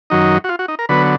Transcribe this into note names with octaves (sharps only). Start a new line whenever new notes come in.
F#2 D#3 F#3 D#4
F#4
F4
F#4
D#4
A#4
D3 F#3 B3 B4